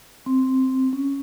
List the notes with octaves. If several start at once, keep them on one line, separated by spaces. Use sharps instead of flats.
C4
C#4